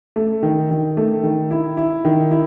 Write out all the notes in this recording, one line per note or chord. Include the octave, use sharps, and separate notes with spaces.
A3
D#3
D#3
A3
D#3
E4
E4
D#3
E4